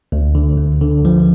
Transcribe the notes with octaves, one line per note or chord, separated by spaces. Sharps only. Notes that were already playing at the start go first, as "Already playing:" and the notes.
D2
D3
D2
D3
F3